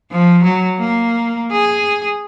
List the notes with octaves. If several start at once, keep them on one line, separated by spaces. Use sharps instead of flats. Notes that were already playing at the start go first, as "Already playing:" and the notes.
F3
F#3
A#3
G#4